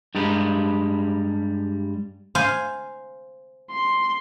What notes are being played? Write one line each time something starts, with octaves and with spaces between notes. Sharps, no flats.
G2 G3 G#3 G4 A#4 B4
C5 F5 G#5
C6